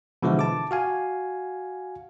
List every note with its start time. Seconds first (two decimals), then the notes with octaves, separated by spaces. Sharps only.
0.22 B2 D3 E3 F3 G#3 E4
0.39 A5 D6
0.71 F#4 F5 G#5